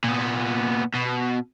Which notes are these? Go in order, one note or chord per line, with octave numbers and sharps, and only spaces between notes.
A#2 B3
B2